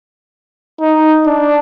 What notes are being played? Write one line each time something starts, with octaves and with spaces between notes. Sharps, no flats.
D#4
D4